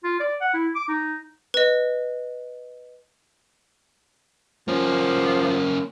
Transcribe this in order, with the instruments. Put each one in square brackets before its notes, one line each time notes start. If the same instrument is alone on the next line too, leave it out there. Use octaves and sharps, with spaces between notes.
[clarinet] F4
D5
F#5
E4
D6
D#4
[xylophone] B4 D#5
[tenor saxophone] F3 [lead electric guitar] A#3 C#4